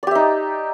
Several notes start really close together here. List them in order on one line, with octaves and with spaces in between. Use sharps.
D5 G4 E5 D#4